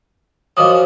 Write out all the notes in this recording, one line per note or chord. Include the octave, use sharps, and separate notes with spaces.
F#2 F3 F#3 D#5 D6 D#6